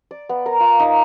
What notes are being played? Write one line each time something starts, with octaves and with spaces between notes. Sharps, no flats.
D5
B3
A#4
F4
D#4